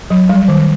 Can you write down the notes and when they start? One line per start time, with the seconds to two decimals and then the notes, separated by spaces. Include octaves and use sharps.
0.10 F#3
0.29 G3
0.48 D#3